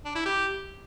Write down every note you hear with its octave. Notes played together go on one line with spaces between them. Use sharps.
D4
E4
G4